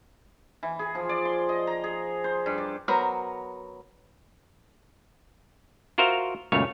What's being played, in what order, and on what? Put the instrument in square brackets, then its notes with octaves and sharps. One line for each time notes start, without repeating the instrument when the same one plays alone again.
[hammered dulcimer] E3
G#4
F3
D5
C6
D#5
A#5
G#4
C5
G2
D5
[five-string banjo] F#3 B3 A#4 C5
[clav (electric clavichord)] F4 F#4 A#4 C5 E5 F5
C#2 F#2 A#2 A3 C#5 F5